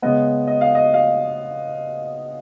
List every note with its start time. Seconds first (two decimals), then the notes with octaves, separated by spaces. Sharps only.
0.02 C#3 G#3 B3 D#5
0.47 D#5
0.61 F5
0.75 D#5
0.94 F5